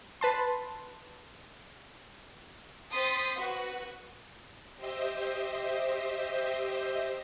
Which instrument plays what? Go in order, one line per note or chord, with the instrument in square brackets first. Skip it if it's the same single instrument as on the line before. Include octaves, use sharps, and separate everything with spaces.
[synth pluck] B4 A5 C6
[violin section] C4 C6 D#6 A6 B6
F#4 B4
[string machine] G4 C5 D#5 E5